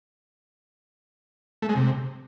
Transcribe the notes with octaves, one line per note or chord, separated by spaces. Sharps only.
A3
G#3
C3